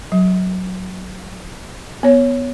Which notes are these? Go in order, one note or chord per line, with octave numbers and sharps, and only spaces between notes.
F#3
B3 C#5